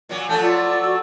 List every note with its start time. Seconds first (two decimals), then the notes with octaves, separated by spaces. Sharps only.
0.09 A#2 F#3
0.29 F3 F#3 A3 A5 E6 G6
0.43 F4 D5 E6
0.85 F#4